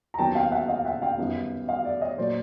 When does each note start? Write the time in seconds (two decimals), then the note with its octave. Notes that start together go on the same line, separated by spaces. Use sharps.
0.14 A#5
0.19 D#2 D#3 F#3 B3 G5 A5
0.35 F5 G5
0.51 E5 F#5
0.68 D#5 F5
0.85 E5 F#5
1.02 F5 G5
1.18 F#2 D#3 G3 B3
1.68 D#5 F5
1.85 D5 E5
2.01 C#5 D#5
2.18 A#2 F#3 A#3 C5 D5